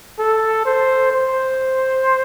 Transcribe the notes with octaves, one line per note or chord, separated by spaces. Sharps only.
A4
C5
C5